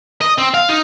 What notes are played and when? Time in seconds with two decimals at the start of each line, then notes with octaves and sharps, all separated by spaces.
0.21 D#5
0.38 C4
0.54 F5
0.69 D#4